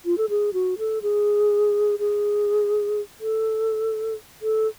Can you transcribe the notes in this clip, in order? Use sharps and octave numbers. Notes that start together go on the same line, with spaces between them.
F4
A4
G#4
F#4
A4
G#4
G#4
A4
A4